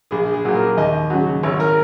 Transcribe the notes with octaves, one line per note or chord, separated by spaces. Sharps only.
A#1 G#4
G#4
A#2 F#3
A#4
D#2 D#5
C#3 F#3
G#1 C#5
A#4